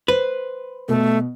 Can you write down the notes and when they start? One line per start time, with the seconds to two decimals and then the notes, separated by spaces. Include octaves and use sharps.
0.08 B4 C5
0.89 B2 A3